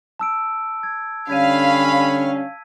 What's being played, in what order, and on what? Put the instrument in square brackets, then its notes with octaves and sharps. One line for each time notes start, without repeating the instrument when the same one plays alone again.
[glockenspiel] A5 E6 D7
G#6
[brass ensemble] D3 G3 C#4 [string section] F5 [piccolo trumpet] B5 [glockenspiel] G#6 B6 D#7